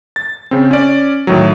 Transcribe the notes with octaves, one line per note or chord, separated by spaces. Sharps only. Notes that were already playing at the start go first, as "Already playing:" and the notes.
A6
C#3 C4
C#4 D5
A2 D#3 F#3